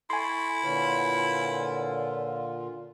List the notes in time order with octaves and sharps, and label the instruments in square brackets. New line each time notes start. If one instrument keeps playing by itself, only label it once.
[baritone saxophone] E4 [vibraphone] A4 C#6 [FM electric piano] G#5 C6
[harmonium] A#2 D3 F4 [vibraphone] B4 C#5 F#5